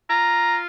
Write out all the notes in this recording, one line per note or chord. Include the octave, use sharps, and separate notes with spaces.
F4 A#5